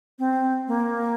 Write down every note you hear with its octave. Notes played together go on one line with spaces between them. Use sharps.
C4
A#3